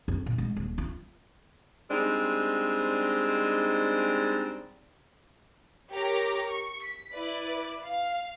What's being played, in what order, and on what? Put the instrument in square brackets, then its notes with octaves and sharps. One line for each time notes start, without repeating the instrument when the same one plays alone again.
[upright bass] F2
A#2
G#3
D#1
F4
[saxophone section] G3 G#3 C4 D4 D#4
[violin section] G4 A#4 C#5 A#5 D6
C#6
B6
E4 B4 D5
F5